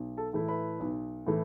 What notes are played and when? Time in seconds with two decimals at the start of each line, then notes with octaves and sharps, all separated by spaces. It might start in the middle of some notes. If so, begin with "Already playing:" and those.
Already playing: B1
0.17 A4 A5
0.33 A2 E3 A3 E4
0.48 B4 B5
0.80 B1
1.27 A2 E3 A3